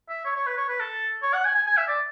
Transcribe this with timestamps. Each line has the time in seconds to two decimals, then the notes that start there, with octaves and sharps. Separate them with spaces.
0.09 E5
0.25 C#5
0.36 C#5
0.47 B4
0.58 C#5
0.69 B4
0.80 A4
1.22 C#5
1.33 F#5
1.44 G#5
1.55 G#5
1.66 G#5
1.77 E5
1.88 D5